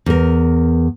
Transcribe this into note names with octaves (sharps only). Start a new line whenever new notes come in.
E2 A#4